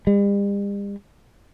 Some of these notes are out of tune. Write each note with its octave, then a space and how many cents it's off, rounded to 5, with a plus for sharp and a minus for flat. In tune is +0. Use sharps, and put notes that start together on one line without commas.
G3 +45